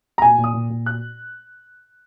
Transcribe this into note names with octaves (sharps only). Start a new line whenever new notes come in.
A#5
A#2 G#5
A#2
D#6
A#2
A#2
F#6